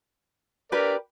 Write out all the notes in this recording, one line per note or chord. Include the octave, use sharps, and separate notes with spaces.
D4 G4 A#4 B4 D5